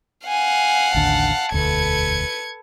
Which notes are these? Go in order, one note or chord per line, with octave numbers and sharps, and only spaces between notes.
F5 F#5 G#5
A1 D#2 D3 A5
E1 D2 A4 B4 G#6 C#7